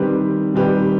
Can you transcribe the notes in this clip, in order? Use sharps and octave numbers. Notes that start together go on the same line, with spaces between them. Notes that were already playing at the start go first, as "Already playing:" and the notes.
Already playing: D#3 G3 C4 G4 B4
D#3 G3 C4 G4 B4